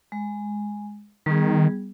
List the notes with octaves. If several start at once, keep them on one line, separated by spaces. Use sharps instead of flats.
G#3
D#3 G3 B3 G#4